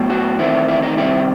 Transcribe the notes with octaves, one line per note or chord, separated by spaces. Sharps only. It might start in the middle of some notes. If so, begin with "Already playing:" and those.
Already playing: A2 F#3 B3
F#4
E2 D#3 A3 C4 E4
E4
D#4
C3 D#3 G3 C4 E4